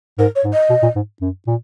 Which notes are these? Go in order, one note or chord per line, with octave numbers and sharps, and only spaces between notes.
G#2 A#4
C#5
G#2
D#5
B2
A#2
G#2
F#2
A#2